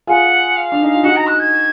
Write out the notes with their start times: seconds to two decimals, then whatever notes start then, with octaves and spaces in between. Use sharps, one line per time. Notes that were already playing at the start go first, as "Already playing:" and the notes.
0.07 F4 G#4 F#5
0.56 F5
0.72 D4
0.82 D#4
0.93 F4
1.03 D#4 F#4 F#5
1.16 A#5
1.27 F#6
1.40 G#6